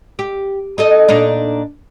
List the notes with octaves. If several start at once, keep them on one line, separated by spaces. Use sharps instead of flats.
G4
D#4 A4 D#5
A#2 D4 D#4